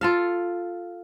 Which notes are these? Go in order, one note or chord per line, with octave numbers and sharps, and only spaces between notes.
F4 A4 F5